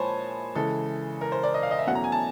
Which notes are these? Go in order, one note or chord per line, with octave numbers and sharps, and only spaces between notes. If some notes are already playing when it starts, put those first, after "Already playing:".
Already playing: A#2 F3 G#3 C5 C#5 G#5 A5 B5
C#3 E3 G#3 A4
A#4
C5
D5
D#5
F5
D#5
E5
E2 B2 F#3 A3 C#4 F#5
A#5
G#5
A5